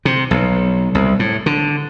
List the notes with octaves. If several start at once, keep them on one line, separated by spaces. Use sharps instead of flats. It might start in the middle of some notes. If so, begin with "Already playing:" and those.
C3
B1
C2
A2
D3